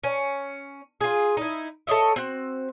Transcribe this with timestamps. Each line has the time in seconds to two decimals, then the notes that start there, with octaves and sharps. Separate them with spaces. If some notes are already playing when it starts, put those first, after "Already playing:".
0.04 C#4
1.01 F4 G#4
1.37 D#4 E4
1.87 A4 C#5 D#5 E5
2.16 C4 F#4